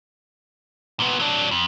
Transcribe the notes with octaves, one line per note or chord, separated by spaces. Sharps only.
A#2 B3
F#3 D4
F2